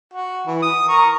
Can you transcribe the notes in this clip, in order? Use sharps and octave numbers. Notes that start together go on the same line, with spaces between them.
F#4
E3
D#6
A#4 A#5 C#6